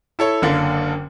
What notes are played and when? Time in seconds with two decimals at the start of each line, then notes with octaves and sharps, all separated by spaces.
0.19 E4 A4 C#5
0.42 F#1 D3 A#3